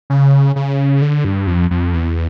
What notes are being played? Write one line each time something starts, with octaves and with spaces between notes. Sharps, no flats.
C#3
C#3
D3
G2
F2
F2
E2